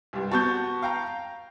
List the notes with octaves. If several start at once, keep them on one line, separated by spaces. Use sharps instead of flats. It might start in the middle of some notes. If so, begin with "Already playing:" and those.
C2 G2
B3 F#4 A5 C#6 G6
F5 G5 A#5